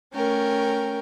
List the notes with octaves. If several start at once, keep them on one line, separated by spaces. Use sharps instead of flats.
A3 C#4 A#4 G5